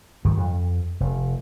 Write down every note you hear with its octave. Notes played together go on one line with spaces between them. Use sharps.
G#2 D#3 F3 G3
F2
F1